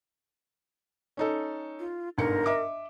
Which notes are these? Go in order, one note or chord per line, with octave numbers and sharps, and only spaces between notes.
C#4 D#4 A4
F4
G1 G#2 A#4 C#7
D#5 E5 D6